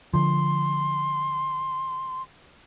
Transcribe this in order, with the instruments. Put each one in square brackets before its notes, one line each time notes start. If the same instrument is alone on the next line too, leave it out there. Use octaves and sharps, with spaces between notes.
[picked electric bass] D3 F3 [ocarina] C6